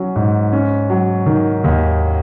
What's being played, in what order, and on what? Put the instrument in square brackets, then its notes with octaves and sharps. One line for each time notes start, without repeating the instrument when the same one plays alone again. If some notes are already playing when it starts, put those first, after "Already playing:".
Already playing: [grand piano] F#3 C#4
G#2
C#4
F#3
D#3
D#2